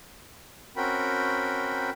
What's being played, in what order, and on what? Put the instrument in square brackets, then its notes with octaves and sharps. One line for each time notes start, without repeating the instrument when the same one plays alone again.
[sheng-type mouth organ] C4 C#4 F#4 A#4 G5 B5